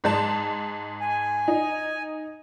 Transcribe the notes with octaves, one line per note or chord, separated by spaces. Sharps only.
G#2 G#3 A5
G#5
D#4